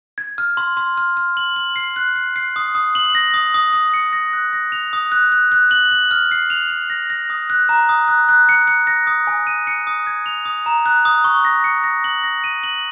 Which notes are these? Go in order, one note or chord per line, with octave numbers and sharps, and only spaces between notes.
G#6
F6
C6
C6
F6
F6
F#7
F#7
C7
F#6
C7
C7
D#6
D#6
F#7
A#6
D#6
D#6
D#6
C#7
A#6
F#6
A#6
F7
D#6
F#6
F#6
F#6
F#7
F#7
F6
C7
F7
F7
A#6
A#6
D#6
F#6
A#5
D#6
F#6
F#6
C#7
C#7
A#6
D#6
G#5
D#7
C#7
D#6
G#6
F7
D#6
A#5
F#6
D#6
C#6
A#6
C#7
A#6
F#7
A#6
D#7
F#7